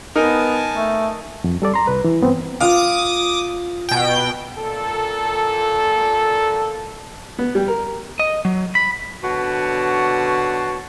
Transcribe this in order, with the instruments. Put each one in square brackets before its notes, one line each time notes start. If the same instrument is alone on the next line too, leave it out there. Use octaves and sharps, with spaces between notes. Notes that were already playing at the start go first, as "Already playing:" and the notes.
[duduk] B3 [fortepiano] D#4 A#4 [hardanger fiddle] G#5 A5
[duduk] A3
[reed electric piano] F2
G3 A4 D5
A#5 C6
C2 B4
E3
G2 B3 C4
[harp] F4 F5 [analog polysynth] D6 D#6
[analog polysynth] B2 G5
[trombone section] A#2 A4
[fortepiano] B3
G3
A#4
[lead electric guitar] D#5
F#3
B5
[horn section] B2 D3 C#5 F#5 A5